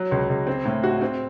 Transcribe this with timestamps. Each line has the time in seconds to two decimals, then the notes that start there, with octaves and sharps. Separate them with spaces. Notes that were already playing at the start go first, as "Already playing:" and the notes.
Already playing: F#3
0.11 C#2
0.29 C#2
0.47 C4
0.65 A2
0.84 F#4
1.02 C4